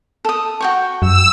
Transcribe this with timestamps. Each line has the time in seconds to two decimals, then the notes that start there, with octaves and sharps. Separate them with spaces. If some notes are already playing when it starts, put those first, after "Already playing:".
0.25 A4 D#6
0.61 F#4 G5 C#6
1.02 F#2 E6